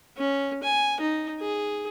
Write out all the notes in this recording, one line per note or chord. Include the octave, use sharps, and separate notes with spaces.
C#4
G#5
D#4
G#4